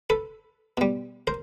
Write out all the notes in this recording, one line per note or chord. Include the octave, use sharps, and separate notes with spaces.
A4 B4
B2 G3
A#4 C5